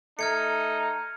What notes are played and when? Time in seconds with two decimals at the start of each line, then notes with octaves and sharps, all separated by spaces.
0.19 A3 D#4 F6 G#6 C#7